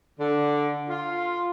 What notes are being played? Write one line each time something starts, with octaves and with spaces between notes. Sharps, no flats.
D3
F4